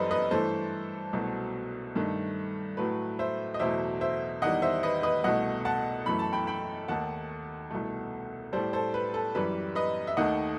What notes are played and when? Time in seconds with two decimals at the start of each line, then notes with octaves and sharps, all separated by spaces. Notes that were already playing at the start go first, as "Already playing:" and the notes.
Already playing: F#2 E3 G3 A4 B4 C5 D#5
0.11 B4 D#5
0.31 G2 E3 A3 A4 C5
1.13 C2 B2 F#3 A3
1.95 G2 D#3 A3
2.77 A2 F#3 A3 B4
3.19 C5 E5
3.54 D#5
3.59 E2 B2 F#3 A3 C5 E5
4.01 C5 E5
4.42 E2 D#3 G3 D#5 F#5
4.62 C5 E5
4.83 B4 D#5
5.03 B4 D#5
5.24 C2 B2 A3 D#5 F#5
5.65 F#5 A5
6.06 F#2 E3 A3 B5
6.19 A5
6.33 G5 B5
6.47 G5 B5
6.88 D#2 D#3 A3 F#5 A5
7.71 C2 B2 A3
8.53 A2 G3 A4 C5
8.73 A4 C5
8.94 B4
9.14 A4
9.35 F#2 E3 G3 B4
9.75 B4 D#5
10.07 E5
10.17 D#2 D#3 A3 D#5 F#5